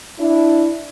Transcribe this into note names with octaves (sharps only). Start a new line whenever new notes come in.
D4 E4